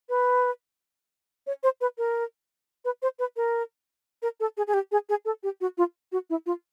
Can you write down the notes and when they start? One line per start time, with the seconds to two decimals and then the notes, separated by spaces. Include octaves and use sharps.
0.09 B4
1.47 C#5
1.63 C5
1.81 B4
1.98 A#4
2.85 B4
3.02 C5
3.19 B4
3.36 A#4
4.22 A#4
4.40 A4
4.57 G#4
4.67 G#4
4.74 G4
4.92 G#4
5.09 G#4
5.25 A4
5.43 G4
5.61 F#4
5.78 F4
6.12 F#4
6.30 E4
6.46 F4